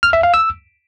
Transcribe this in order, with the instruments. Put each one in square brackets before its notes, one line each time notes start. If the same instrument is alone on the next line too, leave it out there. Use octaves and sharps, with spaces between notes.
[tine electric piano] F6
E5
F5
E6